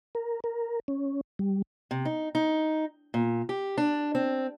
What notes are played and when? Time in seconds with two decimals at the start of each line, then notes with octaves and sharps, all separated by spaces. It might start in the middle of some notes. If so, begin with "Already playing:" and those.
0.15 A#4
0.44 A#4
0.88 C#4
1.39 G3
1.91 C3
2.05 D#4
2.35 D#4
3.14 A#2
3.49 G4
3.78 D4
4.15 C4